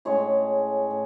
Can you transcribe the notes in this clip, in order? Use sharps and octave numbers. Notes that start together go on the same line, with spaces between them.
A2 G#3 C#4 C#5
A2